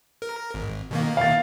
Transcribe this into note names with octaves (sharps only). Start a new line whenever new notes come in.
A#4
G#1
B2 D#3 A#3
F5 A6